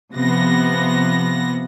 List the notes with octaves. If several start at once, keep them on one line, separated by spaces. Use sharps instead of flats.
C3 F3 B3 A#6